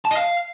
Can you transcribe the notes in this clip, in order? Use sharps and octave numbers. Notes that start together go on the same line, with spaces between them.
A5
D#5
F5